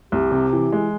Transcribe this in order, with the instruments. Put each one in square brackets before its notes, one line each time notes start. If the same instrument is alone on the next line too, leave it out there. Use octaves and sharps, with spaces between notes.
[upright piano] C2 [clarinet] G4
[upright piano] C3
E3
G#3